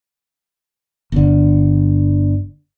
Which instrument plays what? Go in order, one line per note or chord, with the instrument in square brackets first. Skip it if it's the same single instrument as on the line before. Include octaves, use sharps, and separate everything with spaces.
[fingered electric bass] G1 D3